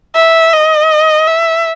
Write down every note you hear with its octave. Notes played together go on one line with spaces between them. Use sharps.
E5
D#5
E5